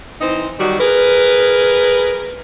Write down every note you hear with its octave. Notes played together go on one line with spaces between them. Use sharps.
E3 C4 D#4 C5
D#3 F#3 G3 F#4
G#4 A#4 B4